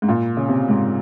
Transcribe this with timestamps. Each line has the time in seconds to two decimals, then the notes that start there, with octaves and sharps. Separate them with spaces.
0.02 G#2
0.09 A#2
0.37 C#3
0.49 C3
0.68 G#2